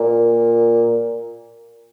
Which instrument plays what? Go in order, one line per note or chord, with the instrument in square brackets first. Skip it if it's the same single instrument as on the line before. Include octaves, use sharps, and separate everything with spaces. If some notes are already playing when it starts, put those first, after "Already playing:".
Already playing: [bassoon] A#2